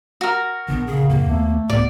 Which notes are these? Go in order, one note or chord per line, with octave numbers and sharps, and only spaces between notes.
F#4 A#4
A#1 D3 B3
C#3 G#4
F2 A#2 A#3
D#2 A3 B3
D1 A2 B3 D5